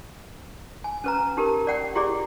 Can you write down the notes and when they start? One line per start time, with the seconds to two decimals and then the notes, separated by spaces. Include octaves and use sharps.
0.84 G#5
1.04 C#4 B4 A#5
1.37 D#4 G4 A#4
1.67 D5 F#5 G5
1.95 E4 G4 G#4 D5